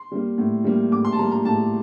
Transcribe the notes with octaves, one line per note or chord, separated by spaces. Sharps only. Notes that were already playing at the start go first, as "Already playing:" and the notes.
Already playing: C6
G3 A#3
A2
G3 A#3
A2 D6
C6
A5
G3 A#3 A#5
A#5
A2 A5